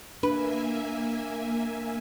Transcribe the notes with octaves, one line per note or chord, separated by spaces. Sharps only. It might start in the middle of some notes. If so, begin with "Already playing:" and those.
A#3 D4 B4 E5 G#5